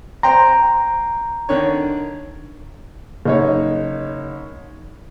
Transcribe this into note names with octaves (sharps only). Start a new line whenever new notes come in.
C5 G5 A#5 C6
D3 D#3 C#5
F#1 D#4 C#5